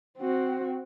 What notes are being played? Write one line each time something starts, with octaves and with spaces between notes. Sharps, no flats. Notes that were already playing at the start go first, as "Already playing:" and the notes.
C4 F#4